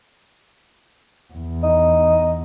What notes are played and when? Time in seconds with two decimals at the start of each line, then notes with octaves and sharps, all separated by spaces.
1.34 E2
1.63 D#4